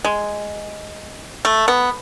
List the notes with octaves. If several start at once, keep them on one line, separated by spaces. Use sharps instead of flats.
G#3
A3
B3